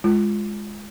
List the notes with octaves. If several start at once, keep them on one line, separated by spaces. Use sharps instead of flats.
G#3 F4